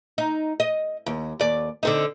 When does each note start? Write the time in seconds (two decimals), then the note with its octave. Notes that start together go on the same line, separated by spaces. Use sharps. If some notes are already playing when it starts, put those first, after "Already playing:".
0.18 D#4
0.60 D#5
1.06 D#2
1.39 D#2 D5
1.83 D3 C4 D#4